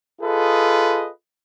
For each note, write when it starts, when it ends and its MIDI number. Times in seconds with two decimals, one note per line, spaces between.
0.21 1.09 65
0.21 1.09 68
0.21 1.09 69
0.21 1.09 71
0.21 1.09 75